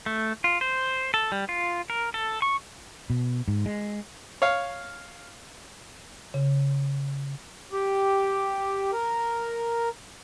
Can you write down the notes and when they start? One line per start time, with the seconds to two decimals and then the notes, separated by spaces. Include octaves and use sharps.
0.06 A3
0.44 F4
0.61 C5
1.14 A4
1.32 G3
1.49 F4
1.90 A#4
2.14 A4
2.42 C#6
3.10 B2
3.48 G#2
3.66 G#3
4.42 C#5 F5
6.34 C#3
7.72 G4
8.93 A#4